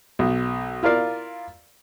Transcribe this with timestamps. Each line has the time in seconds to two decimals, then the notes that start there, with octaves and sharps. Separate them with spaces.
0.19 B1
0.83 E4 F4 A#4 D5 F5